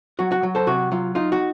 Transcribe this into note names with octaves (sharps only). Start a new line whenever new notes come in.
F#3 F#4
F#4
F#3
A4 C5
C3 F#4
F#3 F4
D#4 F4
F#4